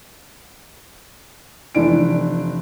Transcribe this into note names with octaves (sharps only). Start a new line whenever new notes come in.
F1 E3 D4 D7